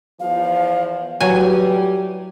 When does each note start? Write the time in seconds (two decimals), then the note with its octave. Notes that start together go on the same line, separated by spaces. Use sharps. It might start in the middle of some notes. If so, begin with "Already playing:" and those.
0.20 E2 F3 F5
1.21 A2 F#3 G3 G4 B4 G#5